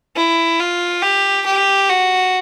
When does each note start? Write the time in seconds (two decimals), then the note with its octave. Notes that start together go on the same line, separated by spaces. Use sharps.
0.16 E4
0.60 F4
1.02 G4
1.46 G4
1.90 F#4